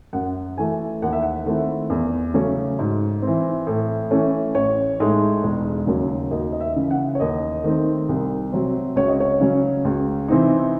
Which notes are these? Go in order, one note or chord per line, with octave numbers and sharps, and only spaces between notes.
F#2 F#5
E3 A3 G#5
D#2 F#5
E5
F#5
D#3 A3 C4 E4
E2
C#3 F#3 A3 C#4
G#2
E3 C4
A2
E3 A3 C#4
A1 C#5
A2 G#3 D#4
E1
D#2 C#3 F#3
D#2 D#5
D#5
E5
C#3 E3
F#5
C#5
D#2 D#5
D#3 A3 C4 D#4
C2
C3 F#3 C4
C#2 C#5
D#5
C#5
C#3 F#3 C#4
C#2
C3 E3 C4 D#4